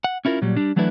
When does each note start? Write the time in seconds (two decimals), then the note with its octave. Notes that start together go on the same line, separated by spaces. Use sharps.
0.04 F#5
0.25 C#4 E4 F4 A#4
0.42 A#2 F#3 G3
0.57 G3 D4
0.76 E3 F#3 A3 D4 E4 B4